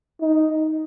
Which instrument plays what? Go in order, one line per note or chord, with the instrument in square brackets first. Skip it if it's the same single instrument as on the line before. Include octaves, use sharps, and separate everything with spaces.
[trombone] D#4